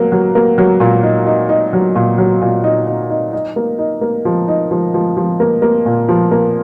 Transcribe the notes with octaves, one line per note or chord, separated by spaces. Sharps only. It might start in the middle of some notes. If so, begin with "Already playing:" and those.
Already playing: F#3 A#3
F#3
A#3
F#3
A#2
D#4
D#4
D#4
F#3
A#2
F#3
A#2
D#4
D#4
D#4
D#4
A#3
D#4
A#3
F3
D#4
F3
F3
F3
A#3
A#3
A#2
F3
A#3